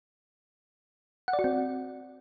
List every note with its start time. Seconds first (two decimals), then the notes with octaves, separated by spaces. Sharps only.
1.28 F#5
1.33 D5
1.39 F#4
1.44 C4